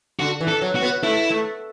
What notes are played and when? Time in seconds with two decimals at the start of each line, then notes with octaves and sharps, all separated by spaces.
0.20 D3 F#4
0.41 E3
0.48 A4
0.62 F#3
0.75 F#4
0.82 B3
1.03 A3 E4
1.30 A3